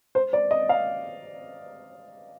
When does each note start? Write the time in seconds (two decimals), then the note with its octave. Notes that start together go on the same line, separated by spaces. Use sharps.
0.15 C5
0.33 D5
0.51 D#5
0.69 F5